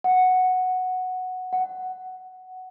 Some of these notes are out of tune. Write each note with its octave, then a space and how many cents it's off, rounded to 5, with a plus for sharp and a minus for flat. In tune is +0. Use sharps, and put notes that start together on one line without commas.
F#5 -5
F#5 +5